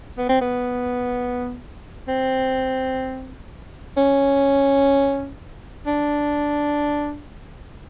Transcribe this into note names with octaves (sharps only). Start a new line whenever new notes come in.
B3
C4
B3
C4
C#4
D4